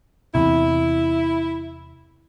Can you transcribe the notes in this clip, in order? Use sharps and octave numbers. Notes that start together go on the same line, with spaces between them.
E2 C3 E4